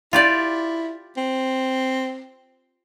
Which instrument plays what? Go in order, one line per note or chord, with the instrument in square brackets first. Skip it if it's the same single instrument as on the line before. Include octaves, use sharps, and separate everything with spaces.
[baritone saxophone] E4 [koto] F4 G4 D5
[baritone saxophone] C4